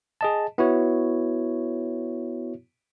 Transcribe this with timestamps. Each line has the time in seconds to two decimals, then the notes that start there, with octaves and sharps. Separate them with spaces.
0.21 G#4 D#5 A5
0.58 B3 E4 F#4 C#5